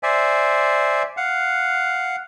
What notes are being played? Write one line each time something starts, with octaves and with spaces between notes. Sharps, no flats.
C5 D5 E5 G#5
F5 F#5